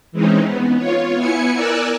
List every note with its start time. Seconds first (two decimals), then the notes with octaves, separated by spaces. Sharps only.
0.12 E3 G#3 C4 C#4 D#4
0.43 B3
0.77 F4 C#5
1.15 B3 E4 G#5 C#7
1.54 A#4 D5 G#5 E6 F#6